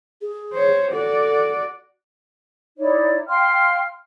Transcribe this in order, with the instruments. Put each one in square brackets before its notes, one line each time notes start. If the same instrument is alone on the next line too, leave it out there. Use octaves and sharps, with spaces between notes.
[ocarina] G#4
[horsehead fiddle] C5 C#5
[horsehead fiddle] F#4 D5 [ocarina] A4
[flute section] D#4 E4 C#5 D5
F5 G5 C6 F6